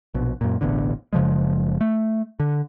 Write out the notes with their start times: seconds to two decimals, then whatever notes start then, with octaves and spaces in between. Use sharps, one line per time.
0.14 A#1 B2
0.41 F#2 A#2
0.61 E1 A1 E2 D3
1.13 F#1 C#3 F3 G#3
1.81 A3
2.40 D3